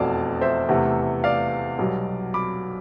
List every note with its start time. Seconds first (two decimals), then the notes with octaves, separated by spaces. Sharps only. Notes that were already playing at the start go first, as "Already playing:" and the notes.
Already playing: F1 E2 B2 D5 F5 A5
0.41 C5 E5
0.69 E2 C3 E3 A3
1.24 D5 F5
1.79 B1 B2 G3
2.34 B5 D6